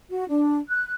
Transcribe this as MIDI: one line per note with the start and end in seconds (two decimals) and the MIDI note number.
0.10 0.24 66
0.28 0.57 62
0.69 0.94 90